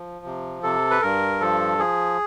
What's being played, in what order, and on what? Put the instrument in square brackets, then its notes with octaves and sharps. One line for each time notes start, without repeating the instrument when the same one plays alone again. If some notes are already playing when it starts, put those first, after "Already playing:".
Already playing: [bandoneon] F3
C3
C3 A4
B4
G2 A#4
F3 A4
F3 G#4